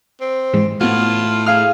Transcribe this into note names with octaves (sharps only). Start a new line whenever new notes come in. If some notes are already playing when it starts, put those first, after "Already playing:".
C4
G#2 E3 G#3
A2 B3 F4 F#4
G#4 F5 F6